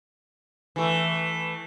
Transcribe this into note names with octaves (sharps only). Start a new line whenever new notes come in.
E3 A3